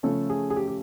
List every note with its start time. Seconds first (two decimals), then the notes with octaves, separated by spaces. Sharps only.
0.03 C#3 F3 A3 C#4 A4
0.30 G#4
0.50 G#4
0.56 G4
0.67 G4